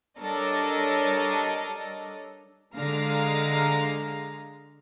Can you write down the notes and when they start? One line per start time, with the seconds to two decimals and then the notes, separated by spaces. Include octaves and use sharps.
0.20 G3 D4 A4 A#4 C#5 D#5
2.77 D3 G#3 F5 A#5